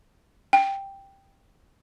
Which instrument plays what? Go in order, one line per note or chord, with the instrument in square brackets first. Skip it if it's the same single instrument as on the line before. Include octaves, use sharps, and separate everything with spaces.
[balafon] G5